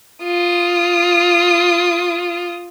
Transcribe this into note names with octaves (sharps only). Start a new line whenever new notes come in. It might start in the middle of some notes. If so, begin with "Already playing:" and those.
F4 D#6